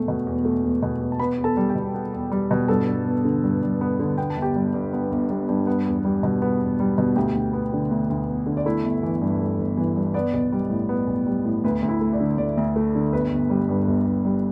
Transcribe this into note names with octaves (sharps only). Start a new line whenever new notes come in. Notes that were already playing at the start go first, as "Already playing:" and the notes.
Already playing: E1 A3
B2
E2
A3
E1
B2
E2
A5
B3 B4 B5
E2
A4 A5
G3
G4 G5
B2
B3
E2
G3
B2
G2 A4 A5
G2
B3
D3
G2
G2
B3
D3
B3 G5
A5
G1
G4 G5
G3
G2
B3
G1
G3
G2
B3
E2
G3
B2
B3
E2
G3
B2
D2 G4 G5
D2
B3
D3
D2
D2
B3
D3
D5
A3 E4 E5
G1
E3
G2
A3
G1
E3
G2
B3 D5
B1
G3
A2
B3
B1
G3
A2
D2 B4
D2
E4 E5
A3
D5
D3
D2 D5
D2
A3
D3
G1 B4
G1
G3
G2
G1
G1
G3